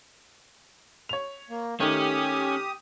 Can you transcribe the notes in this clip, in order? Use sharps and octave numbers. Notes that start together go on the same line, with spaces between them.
C#5 F7
A#3
D#3 A3 C#4 G4 D#6